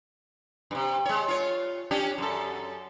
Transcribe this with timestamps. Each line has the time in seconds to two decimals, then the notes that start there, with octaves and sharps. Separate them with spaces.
0.71 G2 C3
1.05 G#3 C#5
1.28 F4 C#5
1.91 C#4 D4 G4
2.18 F#2 A4